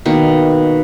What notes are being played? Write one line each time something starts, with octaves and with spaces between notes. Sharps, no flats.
B2 D#3 A#3